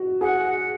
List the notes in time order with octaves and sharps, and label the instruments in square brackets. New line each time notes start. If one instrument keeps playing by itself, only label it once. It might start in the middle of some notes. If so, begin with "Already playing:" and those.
Already playing: [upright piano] F#4
[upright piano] G#4 [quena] F#5